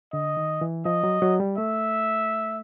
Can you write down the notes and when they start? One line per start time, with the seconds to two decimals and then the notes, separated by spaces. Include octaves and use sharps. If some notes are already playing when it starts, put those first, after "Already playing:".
0.13 D3 D#5
0.37 D#3
0.61 E3
0.85 F3 D#5
1.04 F#3
1.22 F#3
1.40 G3
1.58 A3 E5